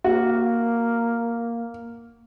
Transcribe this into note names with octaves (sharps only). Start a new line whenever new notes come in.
A#3 F#4